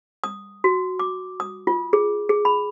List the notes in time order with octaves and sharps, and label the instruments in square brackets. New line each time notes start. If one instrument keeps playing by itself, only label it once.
[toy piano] D#6
F#4
D6
D#6
F4
G#4
G#4
B5